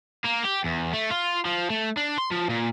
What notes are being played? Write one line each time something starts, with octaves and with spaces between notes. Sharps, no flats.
A#3
G4
E2
A3
F4
F3
A3
D4
C6
F3
A#2